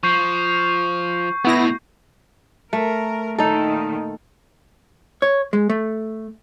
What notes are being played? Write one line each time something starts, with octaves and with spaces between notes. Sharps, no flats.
F3 C#6 G6 C7
B2 A3 B3 E4 A#6
A3 A#4
A#2 D#3 D#4 A4
C#5
G#3
A3